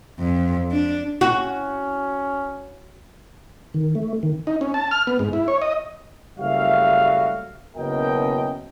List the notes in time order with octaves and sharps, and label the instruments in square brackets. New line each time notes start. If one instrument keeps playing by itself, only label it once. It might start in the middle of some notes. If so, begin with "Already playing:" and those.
[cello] F2
D4
[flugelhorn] C#4 [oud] F#4
[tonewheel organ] D#3
A3
D#3
[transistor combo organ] D#4
C#4
A5
F6
B3
G#2
E4
C#5
D#5
[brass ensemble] F#1 G3 A3 F#4 E5 F5
F#1 B2 C#4 A#4 D#5 G5